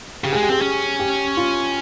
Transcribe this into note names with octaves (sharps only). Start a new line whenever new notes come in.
C#3 G4
G#3 G#4
G4
C4 G#4
C#4
G4
F4